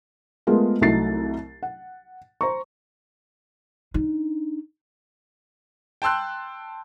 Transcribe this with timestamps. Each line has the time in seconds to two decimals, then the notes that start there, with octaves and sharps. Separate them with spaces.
0.47 G#3 A3 B3 F4 G#4 A#4
0.81 C2 F#3 A3 D#4 A6 C7
1.63 F#5
2.41 C5 A#5 C#6
3.94 D4 D#4
6.02 G5 A5 C6 E6 F#6